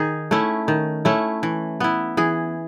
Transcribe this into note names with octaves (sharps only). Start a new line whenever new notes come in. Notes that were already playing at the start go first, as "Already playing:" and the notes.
Already playing: D#3 G#4
A3 C#4 E4
D#3
A3 C#4 E4
E3
B3 E4
E3 G#4